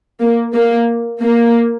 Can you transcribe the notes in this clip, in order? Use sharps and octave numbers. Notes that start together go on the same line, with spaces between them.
A#3
A#3
A#3